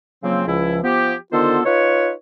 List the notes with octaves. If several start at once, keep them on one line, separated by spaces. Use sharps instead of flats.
C#3 F3 F#3 A#3 C4
C#2 F3 E4
F3 B3 G4
D3 D#3 B3 F4 A4 C5
D#4 F4 B4 C#5